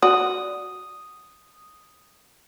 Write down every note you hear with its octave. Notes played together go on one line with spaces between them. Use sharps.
F#4 D5 D#6